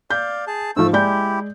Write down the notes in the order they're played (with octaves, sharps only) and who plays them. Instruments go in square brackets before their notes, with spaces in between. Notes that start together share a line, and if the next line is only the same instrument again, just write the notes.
[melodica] D5 F5 [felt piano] G6
[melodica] G#4 A5
[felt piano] G#2 F3 [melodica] A3 E6
[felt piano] G#3 D5 G6 [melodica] E4 G4